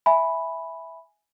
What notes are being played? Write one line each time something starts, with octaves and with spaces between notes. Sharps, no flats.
E5 G#5 B5